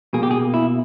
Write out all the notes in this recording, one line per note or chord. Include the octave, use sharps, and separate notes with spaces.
B2 A#3 G#4
G4
G#4
E4